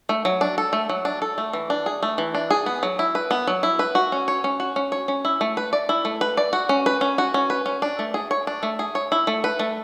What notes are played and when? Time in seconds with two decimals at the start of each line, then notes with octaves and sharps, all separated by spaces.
0.09 A3
0.25 F#3
0.41 D4
0.58 A4
0.73 A3
0.89 F#3
1.05 D4
1.22 A4
1.38 A3
1.53 E3
1.70 D4
1.86 G#4
2.03 A3
2.18 E3
2.35 D4
2.51 G#4
2.66 B3
2.83 F#3
2.99 E4
3.15 B4
3.31 B3
3.47 F#3
3.63 E4
3.79 B4
3.95 F#4
4.12 C#4
4.28 C#5
4.44 C#4
4.60 F#4
4.76 C#4
4.92 C#5
5.08 C#4
5.25 E4
5.41 A3
5.57 B4
5.73 D5
5.89 E4
6.05 A3
6.21 B4
6.37 D5
6.53 F#4
6.69 C#4
6.86 B4
7.01 C#4
7.18 F#4
7.34 C#4
7.50 B4
7.66 C#4
7.82 D4
7.99 A3
8.14 G#4
8.31 C#5
8.47 D4
8.63 A3
8.79 G#4
8.95 C#5
9.12 E4
9.27 A3
9.44 B4
9.59 A3